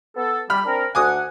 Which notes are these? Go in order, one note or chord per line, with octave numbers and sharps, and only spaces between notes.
B3 A4
G3 B5 F6
C4 D4 A#4
D2 F#5 G#5 D6 D#6